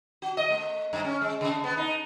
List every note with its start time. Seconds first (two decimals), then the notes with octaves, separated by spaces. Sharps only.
0.22 F#4
0.37 D#5
0.50 A3
0.93 G2
1.05 C#4
1.21 G#3
1.41 C#3
1.64 B3
1.77 D#4